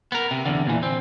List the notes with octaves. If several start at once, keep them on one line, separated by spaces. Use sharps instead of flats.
B3 A#4
C3
E2 D3
A#2 E3
C4